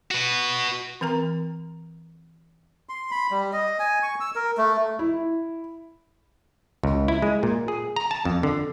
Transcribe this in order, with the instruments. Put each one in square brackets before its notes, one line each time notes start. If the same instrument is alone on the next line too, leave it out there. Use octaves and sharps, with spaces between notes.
[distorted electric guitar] F#4 B4
[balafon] E3 C4 A#4 A#5
[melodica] C6
B5
G3
D#5
G#5
C#6
E6
A#4
A3
[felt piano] E4
[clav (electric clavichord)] C#2
E4
G#3
A#2
G#4
A#5
A5
F2
D3